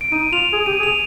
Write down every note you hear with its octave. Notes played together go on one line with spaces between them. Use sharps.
D7
D#4 D#7
F4 F7
G#4
G4 D#7
G#4
F7